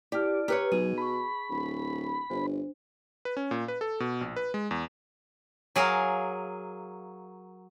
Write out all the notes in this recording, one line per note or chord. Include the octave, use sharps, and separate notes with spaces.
E4 G4 D5 A5 F6
G4 B4 C#5 A#5 E6 F6
B2 F#3 D#4 F#4 G#4 D#7
A5 B5 C#6
D1
G1 D4 C5
B4
C#4
A#2
B4
A4
B2
A#1
B4
G#3
E2
F#3 G#4 A#4 F5